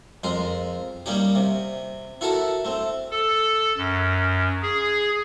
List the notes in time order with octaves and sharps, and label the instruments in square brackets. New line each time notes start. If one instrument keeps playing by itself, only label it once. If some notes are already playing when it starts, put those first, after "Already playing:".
[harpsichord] F2 G#3 A#4 C6
G3 A#3 C#4 D#4 G4
C3
E4 F#4 A4 A#4 A5
A3 C4
[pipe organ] A4
F#2
G#4